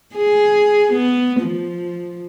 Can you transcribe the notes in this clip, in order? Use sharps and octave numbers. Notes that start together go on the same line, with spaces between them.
G#4
B3
F3